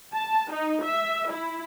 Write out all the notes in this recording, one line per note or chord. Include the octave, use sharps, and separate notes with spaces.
A5
D#4
E5
E4